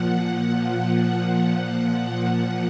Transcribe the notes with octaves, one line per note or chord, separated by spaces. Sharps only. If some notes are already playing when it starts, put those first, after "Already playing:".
Already playing: A#2 F3 F#5
A#2 F3
F#5
A#2 F3 F#5